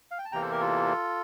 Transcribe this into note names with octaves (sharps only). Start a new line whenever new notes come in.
F5
G5
A5
E2 C3 E3 A#3 G5 A#5
A4 C5
G4 A#4
F4 A4